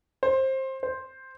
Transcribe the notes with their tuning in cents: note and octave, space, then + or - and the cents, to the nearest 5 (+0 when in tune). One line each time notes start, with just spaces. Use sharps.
C5 +20
C5 +5